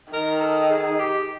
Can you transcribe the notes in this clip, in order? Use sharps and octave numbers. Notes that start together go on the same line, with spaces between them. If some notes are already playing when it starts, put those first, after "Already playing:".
D#3 A#4
A4
G#4
G4